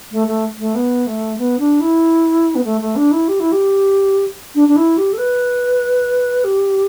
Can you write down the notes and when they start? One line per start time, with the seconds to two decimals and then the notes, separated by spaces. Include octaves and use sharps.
0.12 A3
0.27 A3
0.58 A3
0.75 B3
1.07 A3
1.38 B3
1.59 D4
1.80 E4
2.55 B3
2.64 A3
2.81 A3
2.96 D4
3.12 E4
3.28 G4
3.40 E4
3.52 G4
4.55 D4
4.68 D4
4.76 E4
4.97 G4
5.13 A4
5.18 B4
6.44 G4